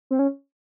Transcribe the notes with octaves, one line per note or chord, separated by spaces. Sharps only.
C4
C#4